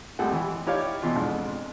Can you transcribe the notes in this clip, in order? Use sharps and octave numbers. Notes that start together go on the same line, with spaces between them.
G#1 G3 A3 F#5 G5
E3
D#4 E4 G4 C#5 D5 F5
B2 E3 F4
F2 G#2 D4